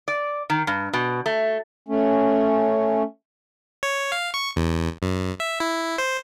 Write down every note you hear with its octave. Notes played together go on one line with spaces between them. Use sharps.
D5
D#3
G2
B2
A3
A3 C#4
C#5
F5
C#6
E2
F#2
E5
E4
C5